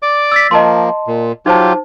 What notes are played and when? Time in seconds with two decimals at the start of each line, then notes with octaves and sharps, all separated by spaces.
0.02 D5 D6
0.32 E6 A6 B6
0.51 F3 A#3 D#5 A5 C6
1.07 A#2
1.46 F#3 D#4 F4 G4 C5 A5